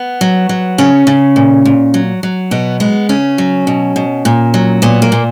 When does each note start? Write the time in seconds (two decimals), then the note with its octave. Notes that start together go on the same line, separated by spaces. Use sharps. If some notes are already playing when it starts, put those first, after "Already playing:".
Already playing: B3
0.21 F#3
0.49 F#3
0.78 C#3 C#4
1.07 C#3
1.36 A#2
1.65 A#2
1.94 F#3
2.23 F#3
2.51 B2 B3
2.80 G#3 B3
3.09 C#3 C#4
3.38 F#3
3.67 B2
3.96 B2
4.25 A#2
4.54 F#3
4.82 A#2 B3
5.02 A#3
5.12 A#2